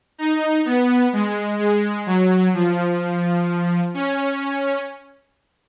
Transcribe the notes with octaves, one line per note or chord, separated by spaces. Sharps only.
D#4
B3
G#3
G#3
F#3
F3
C#4